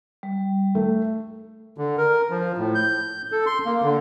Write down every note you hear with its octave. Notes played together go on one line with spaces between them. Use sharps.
G3
A3
D3
A#4
F3
A2
G6
A4
C6
A#3
D3